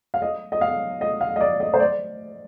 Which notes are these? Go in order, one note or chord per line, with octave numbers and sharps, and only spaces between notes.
F5
D#5
D#5
F5
D#5
F5
D#5
D5
D#5
C5
D5